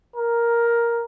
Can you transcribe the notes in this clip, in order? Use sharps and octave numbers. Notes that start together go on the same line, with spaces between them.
A#4